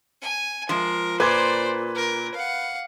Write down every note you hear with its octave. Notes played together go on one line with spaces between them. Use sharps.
G#5
F3 G#3 A#4
A#2 B4 C5 D5 D6 G#6
A#4
F5 F#5